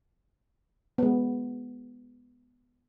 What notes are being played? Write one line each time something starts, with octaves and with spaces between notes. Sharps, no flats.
G#3 B3